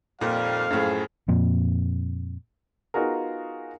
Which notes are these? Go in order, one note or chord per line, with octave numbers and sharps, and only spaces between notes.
F2 A#2 D#3 G3 A#3 F5
F#2 A2 F3 G#4
F2 A#2
B3 D#4 F4 F#4 G#4 A#4